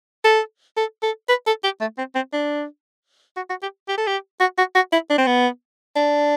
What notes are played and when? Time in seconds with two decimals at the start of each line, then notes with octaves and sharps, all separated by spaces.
0.24 A4
0.76 A4
1.02 A4
1.29 B4
1.46 A4
1.63 G4
1.80 A3
1.98 C4
2.15 C4
2.33 D4
3.36 F#4
3.49 F#4
3.62 G4
3.88 G4
3.97 A4
4.07 G4
4.40 F#4
4.57 F#4
4.75 F#4
4.92 E4
5.10 D4
5.18 C4
5.26 B3
5.96 D4